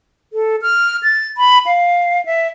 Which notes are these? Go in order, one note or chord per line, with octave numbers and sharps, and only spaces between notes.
A4
F6
A6
B5
F5
E5